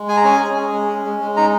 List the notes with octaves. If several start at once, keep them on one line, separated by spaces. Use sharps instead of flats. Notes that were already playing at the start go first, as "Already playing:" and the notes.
Already playing: G#3
G#4 G#5
A#5
C#4 G#5
G#4
G#4
G#3
C#4
G#3
G#3
D#4 A#5